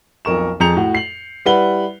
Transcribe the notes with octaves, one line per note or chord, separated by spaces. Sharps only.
B1 F2 A#4 C#6 E7
F2 G#4 A#5 G6 C#7 F7
A2 F#4
C7 F#7
G3 E4 B4 F#5 G7